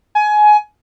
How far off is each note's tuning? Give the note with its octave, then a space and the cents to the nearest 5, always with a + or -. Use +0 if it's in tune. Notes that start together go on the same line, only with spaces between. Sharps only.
G#5 +20